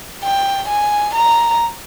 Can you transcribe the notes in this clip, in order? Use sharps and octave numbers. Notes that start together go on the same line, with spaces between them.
G5
G#5
A#5